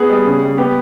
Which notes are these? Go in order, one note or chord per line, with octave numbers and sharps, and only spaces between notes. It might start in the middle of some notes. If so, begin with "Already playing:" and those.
Already playing: B3 G#4
G3
C#3
G3
B3 G4